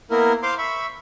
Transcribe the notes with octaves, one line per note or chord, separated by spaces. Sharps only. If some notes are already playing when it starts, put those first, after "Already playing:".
A#3 B3 E4 A#4
C5 F5 C6 D6
E5 B5 C#6